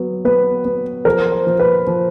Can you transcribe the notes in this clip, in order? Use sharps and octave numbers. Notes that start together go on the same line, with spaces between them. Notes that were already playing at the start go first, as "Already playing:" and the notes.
Already playing: F#3 B3
B3 B4
B3
F3 A#4
C5
F3
B4
F3